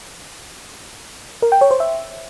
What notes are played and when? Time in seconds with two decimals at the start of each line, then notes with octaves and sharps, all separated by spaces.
1.42 A#4
1.52 G5
1.61 C#5
1.71 C5
1.80 E5